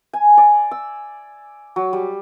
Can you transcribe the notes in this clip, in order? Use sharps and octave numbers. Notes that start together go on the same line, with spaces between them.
G#5
D5
E6
F#3
G3